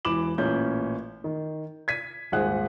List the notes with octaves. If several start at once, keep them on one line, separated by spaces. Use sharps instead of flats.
E1 E3 B5 D6 E7 F#7
A1 A#2 C#4 G6
D#3
G#6 B6 D#7
D#1 G#1 G#4 C5 F#5 F#6